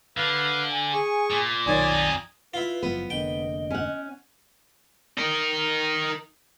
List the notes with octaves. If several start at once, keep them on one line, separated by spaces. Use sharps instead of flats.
D3 B4 F5
G#5
G#4 C#6
A#2
B1 D#3 C#5 D5 G#5 D#6
F2 D#4
E4 F4 B4
F#1 F3 B3
F1 D3 A#3 D#5 G5
C#4 F#5
D#4 A#4